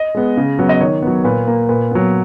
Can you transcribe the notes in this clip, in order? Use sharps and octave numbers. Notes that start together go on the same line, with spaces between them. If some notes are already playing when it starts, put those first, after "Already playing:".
Already playing: D#5
G#3 B3
C#3
F#3 B3
D#5
D#3 C#5
F#3 B3
A#2 B4
A#3
A#2 B4
F#3 B3